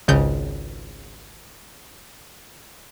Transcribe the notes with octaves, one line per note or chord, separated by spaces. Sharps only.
G#1 C#2 C#3 G6